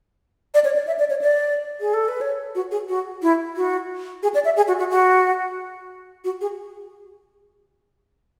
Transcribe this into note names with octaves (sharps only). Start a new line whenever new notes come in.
D5
C#5
D5
E5
D5
C#5
D5
G#4
A4
B4
C#5
F#4
G#4
F#4
E4
F#4
G#4
D5
E5
G#4
F#4
F#4
F#4
F#4
G#4